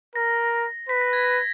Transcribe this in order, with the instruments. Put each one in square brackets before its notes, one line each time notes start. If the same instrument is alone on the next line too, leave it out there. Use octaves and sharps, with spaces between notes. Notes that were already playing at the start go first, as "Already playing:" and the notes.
[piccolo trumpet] A#4 [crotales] A#6
[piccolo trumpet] B4 [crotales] B6
[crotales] A#6
G#6
A#6